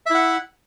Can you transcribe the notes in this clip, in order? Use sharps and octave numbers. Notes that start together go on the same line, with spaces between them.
E4 E5 F#5